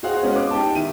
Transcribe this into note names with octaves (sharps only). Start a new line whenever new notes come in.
F#4 G#4 C5 F5 F#5
G#3 B3 C#4
D6
D#4 G4 G5 A5
D#3 E4 D#7